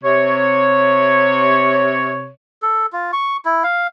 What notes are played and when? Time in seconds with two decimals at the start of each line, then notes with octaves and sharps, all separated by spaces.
0.04 C3 C#5
2.62 A4
2.92 F4
3.13 C#6
3.45 E4
3.64 F5